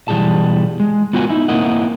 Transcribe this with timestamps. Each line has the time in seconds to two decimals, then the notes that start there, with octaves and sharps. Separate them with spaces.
0.08 B1 E3 F#3 G3 G#4 A5
0.80 G#3
1.13 B3 F4 F#4 A#4 C5 G#5
1.30 D#4 E4
1.48 A#3 C4 E4 A#4 D#5 F#5